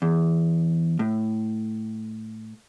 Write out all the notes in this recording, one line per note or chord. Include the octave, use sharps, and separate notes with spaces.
E2
A2